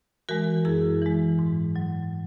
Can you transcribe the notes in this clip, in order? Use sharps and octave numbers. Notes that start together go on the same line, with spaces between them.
E3 G#3 F#4 A#4
F#2 E4 G#4
E3 G#3
G#2
F#3